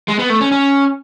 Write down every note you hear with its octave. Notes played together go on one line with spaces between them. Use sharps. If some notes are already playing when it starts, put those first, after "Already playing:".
G#3
B3
A3
C#4
C#4